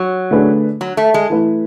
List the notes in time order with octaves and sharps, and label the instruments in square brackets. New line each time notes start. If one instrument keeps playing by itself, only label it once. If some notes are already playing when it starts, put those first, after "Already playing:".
Already playing: [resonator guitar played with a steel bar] F#3
[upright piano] D3 A3 D4 G#4 B4
[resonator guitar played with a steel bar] F#3
A3
G#3
[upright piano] E3 A3 E4 B4